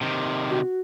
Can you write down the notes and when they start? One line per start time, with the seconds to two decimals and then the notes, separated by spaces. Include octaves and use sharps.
0.01 C3 D#3
0.49 F#4